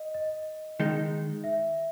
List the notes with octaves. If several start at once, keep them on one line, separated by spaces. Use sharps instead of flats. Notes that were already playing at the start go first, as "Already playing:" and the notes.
Already playing: D#5
D#5
D#3 G#3 D#4
E5